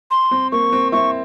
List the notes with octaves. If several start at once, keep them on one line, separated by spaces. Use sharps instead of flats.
C6
C4
A#3 C#6
C4
C4 E4 C#6